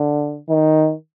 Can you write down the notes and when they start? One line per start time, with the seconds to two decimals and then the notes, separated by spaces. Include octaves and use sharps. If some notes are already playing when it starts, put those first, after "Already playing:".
Already playing: D3
0.49 D#3